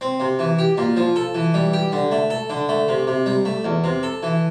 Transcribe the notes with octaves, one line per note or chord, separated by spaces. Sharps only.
C4
C3
E3
G4
A#2
F3
A4
E3
G3
G4
D3
A3
A4
D3
A3
C3
C3
G3
A3
E2
C3
A4
E3